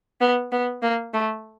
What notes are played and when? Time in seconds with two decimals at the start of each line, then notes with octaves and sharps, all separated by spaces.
0.21 B3
0.52 B3
0.83 A#3
1.14 A3